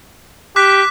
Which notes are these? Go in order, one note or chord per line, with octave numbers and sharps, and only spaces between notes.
G4 D6 F#6 B6